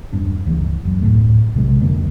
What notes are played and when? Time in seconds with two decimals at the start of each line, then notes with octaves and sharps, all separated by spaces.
0.13 E1 G2 D4
0.46 C#2 E3 A#3
0.85 F#2
1.01 D1 F#2 A2 A3
1.54 B1 C3 G#3
1.81 C2 F2 D3 A#3